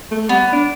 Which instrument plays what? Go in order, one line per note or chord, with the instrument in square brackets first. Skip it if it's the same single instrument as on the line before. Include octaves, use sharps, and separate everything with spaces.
[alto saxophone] A3
[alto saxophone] G3 [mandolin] B3
[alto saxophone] D4